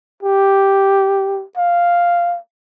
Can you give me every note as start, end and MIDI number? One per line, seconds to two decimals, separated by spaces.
0.23 1.44 67
1.57 2.38 77